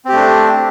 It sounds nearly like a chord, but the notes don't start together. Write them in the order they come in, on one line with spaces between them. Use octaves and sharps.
C4 G4 A3 D4